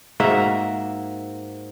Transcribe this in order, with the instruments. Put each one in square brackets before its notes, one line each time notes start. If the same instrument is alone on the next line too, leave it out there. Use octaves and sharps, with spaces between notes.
[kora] G#2 A#3 F#4 E5